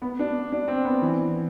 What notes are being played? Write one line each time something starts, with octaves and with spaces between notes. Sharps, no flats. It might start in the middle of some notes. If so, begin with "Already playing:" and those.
B3
D4
D4
C4
B3
E3